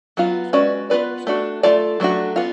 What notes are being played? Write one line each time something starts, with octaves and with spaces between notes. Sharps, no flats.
F#3 B3 F4
G#3 C#4 F#4 B4 D5
B3 F4 B4 D5
A3 D4 F#4
A3 F4 A4 D5
F#3 A3 D4 F#4
B3 F4